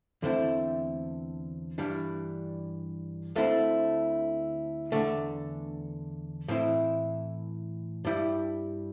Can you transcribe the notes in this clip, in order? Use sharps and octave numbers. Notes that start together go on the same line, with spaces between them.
E2 D3 A3 C4 E4
G2 E3 G3 D4
D2 D3 A3 C4 E4
E2 D3 A3
A2 E3 C4 E4
G2 G3 E4